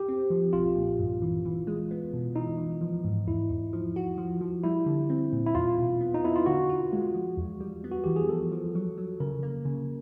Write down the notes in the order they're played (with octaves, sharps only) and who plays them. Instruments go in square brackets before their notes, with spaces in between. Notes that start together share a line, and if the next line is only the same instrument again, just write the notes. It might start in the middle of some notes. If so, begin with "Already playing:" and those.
Already playing: [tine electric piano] G4
[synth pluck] C4
F3
[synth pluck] B1 [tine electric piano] F4
[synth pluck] A#2
G2
E3
E3
G#3
B3
B2
[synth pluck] E3 [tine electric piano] D#4
[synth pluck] E3
F3
G#2
[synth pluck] E2 [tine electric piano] E4
[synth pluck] E2
F3
F#4
F3
F3
[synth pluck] G3 [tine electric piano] E4
[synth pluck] D3
C4
A#2
[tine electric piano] E4
[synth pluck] E2 [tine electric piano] F4
[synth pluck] B2
B3
[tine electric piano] D#4
[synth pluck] B3 [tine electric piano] E4
[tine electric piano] F4
[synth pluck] D3 [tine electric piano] F#4
[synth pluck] F4
G#3
F3
E2
G3
B3
[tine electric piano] F#4
[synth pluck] E3 [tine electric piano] G4
[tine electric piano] G#4
[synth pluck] F3 [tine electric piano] A4
[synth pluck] F3
F#3
F#3
[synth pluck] C#3 [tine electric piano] A#4
[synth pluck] A#3
C#3